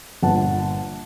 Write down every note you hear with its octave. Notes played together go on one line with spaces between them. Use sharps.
G1 A#2 F#5 A5